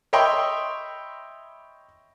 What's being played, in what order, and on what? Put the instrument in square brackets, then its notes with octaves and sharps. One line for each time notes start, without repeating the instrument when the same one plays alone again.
[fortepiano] C#5 D#5 E5 G5 B5 C6